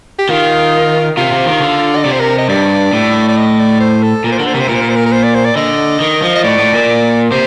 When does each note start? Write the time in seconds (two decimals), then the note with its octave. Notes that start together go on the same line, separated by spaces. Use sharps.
0.19 G4
0.29 D#3 F4
1.17 C3 F4
1.32 C3
1.46 D#3
1.61 D3
1.96 D#5
2.03 C3 D5
2.12 C5
2.20 A#4
2.38 D#5
2.48 G2 D5
2.93 A2
3.28 D5
3.37 D#5
3.59 D5
3.80 C5
4.03 A4
4.24 A#2 A#4
4.32 C5
4.38 D3 A#4
4.46 C5
4.54 C3 A#4
4.60 C5
4.68 A#2 A#4
4.75 C5
4.82 A#4
4.89 C5
4.96 A#4
5.06 A#4
5.12 C5
5.24 D5
5.35 C5
5.45 D5
5.56 D3 D#5
6.01 D#3
6.22 F3
6.35 D#5
6.44 A2 D5
6.59 A2
6.74 A#2
7.32 C3 C5